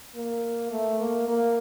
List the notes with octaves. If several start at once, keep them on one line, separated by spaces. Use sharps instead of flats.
A#3
A3
A#3
A#3